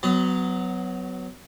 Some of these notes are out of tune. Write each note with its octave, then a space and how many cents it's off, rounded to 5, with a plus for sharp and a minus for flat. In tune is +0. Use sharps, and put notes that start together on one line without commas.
F#3 +0 B3 +25